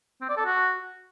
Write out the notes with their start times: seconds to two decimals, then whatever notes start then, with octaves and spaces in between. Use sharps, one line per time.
0.21 C4
0.29 D5
0.37 A4
0.45 F#4